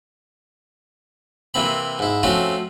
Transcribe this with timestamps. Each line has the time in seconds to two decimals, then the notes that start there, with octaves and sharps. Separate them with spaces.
1.54 C3 E3 A#3 C4 B5
1.99 G#2 E4
2.23 F3 A3 C4 C#4 F4 F#4